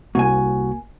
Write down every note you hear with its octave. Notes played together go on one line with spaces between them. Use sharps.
C2 A#3 F#4 G#5